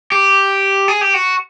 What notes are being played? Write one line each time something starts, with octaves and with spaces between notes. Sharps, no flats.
G4
G#4
G4
F#4